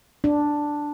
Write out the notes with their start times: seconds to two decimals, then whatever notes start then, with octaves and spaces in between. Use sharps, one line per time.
0.24 D4